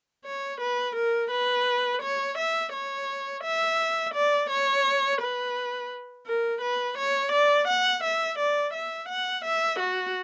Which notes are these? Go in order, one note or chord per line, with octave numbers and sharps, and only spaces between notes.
C#5
B4
A#4
B4
C#5
E5
C#5
E5
D5
C#5
B4
A#4
B4
C#5
D5
F#5
E5
D5
E5
F#5
E5
F#4